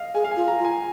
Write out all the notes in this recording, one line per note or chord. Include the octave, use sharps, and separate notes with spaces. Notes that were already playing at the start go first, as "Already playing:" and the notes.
Already playing: D#5 F5
G#4 G#5
F5
F4 G#5
A#5
F4
G#5